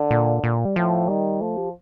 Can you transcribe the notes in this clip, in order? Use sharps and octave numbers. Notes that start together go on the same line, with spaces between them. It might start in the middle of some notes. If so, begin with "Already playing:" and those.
Already playing: D3
A#2
A#2
G3
A2 F3
D#3 G3
F3 A3
G4